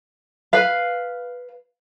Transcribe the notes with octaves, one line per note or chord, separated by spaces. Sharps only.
B4 F5